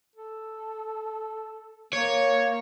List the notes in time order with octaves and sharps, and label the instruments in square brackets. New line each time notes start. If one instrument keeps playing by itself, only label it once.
[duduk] A4
[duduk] A#3 [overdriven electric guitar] C#5